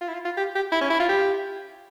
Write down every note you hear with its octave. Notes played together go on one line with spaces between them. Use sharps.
F4
E4
F4
F4
G4
G4
E4
C#4
E4
F4
G4